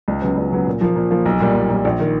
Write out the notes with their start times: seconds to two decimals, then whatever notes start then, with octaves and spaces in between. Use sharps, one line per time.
0.08 C#2
0.22 C#3 F#3 B3
0.37 C#2
0.52 C#3 F#3 B3
0.67 A#2
0.81 F3 A#3
0.96 A#2
1.11 F3 A#3
1.26 B1
1.40 A#2 G3
1.54 B1
1.70 A#2 G3
1.85 A#1
2.00 D#3